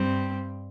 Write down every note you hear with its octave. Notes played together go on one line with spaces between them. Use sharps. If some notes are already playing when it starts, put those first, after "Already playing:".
Already playing: G2 G3 C4